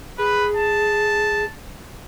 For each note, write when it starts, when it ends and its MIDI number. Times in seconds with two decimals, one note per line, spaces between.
0.18 1.45 68
0.18 0.47 71
0.56 1.49 81